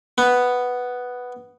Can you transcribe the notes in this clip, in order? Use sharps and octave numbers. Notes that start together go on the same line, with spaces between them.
B3